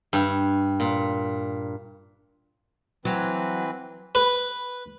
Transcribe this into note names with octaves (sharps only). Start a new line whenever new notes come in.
G2
A#2
E3 F#3 C4 B4
B4